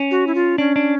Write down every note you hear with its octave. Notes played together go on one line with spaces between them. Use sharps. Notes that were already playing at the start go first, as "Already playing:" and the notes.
Already playing: C#4
F#4
E4
F4
C#4 D4
D4